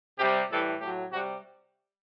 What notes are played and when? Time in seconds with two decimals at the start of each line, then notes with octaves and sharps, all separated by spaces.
0.18 C3 G3 G4
0.50 A2 E3 G3 A4
0.80 A2 F#3 G4
1.11 C3 G3 F#4